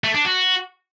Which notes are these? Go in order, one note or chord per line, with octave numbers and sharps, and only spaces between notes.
A3
D4
F#4